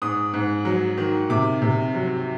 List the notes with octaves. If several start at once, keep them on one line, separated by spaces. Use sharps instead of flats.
G#2 D#6
G#2
F#3
D#3
C3 D6
C3
F#3